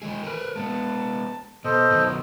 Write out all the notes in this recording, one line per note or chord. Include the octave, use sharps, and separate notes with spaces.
E3 G#3 G#4
A#4 B4
G#3 A#3 B3 A5
B2 A4 C5 D#5
B2 D#3 F#3